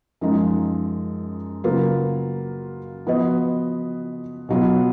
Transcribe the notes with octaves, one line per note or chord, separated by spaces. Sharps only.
F#2 F3 G#3 D#4
C#3 F#3 A#3 F4 B4
F3 B3 F#4 B4 D#5
B2 F#3 B3 F4